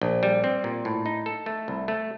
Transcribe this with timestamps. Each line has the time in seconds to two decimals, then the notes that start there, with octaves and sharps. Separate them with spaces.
0.02 A#1
0.23 G3
0.44 C4
0.64 A#2
0.85 A2
1.06 D#4
1.26 A4
1.46 A3
1.68 C2
1.88 A3